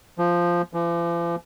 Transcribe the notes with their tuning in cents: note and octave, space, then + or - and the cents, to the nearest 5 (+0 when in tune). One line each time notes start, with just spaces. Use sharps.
F3 -5
F3 -45